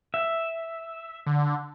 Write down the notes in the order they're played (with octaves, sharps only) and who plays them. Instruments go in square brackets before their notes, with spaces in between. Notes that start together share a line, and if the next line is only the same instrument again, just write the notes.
[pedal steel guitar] E5
[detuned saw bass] D3